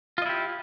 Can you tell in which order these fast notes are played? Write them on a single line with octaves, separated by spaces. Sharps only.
F4 D#5 E4 G4